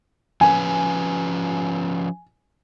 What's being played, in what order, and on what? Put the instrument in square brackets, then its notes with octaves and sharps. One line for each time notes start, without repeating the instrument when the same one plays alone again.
[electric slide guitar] F3 C#4 B4 [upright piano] G#5